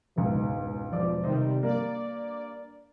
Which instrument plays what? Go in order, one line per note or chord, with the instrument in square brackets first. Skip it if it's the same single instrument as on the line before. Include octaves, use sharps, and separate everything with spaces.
[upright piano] E1 C#2 G#2
[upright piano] E1 D5 D6 [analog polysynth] F3
[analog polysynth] C3 D#3 G3 [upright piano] D#4 C5 D#5
[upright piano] G2 A#3 [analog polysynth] D5